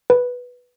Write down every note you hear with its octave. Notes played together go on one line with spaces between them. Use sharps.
B4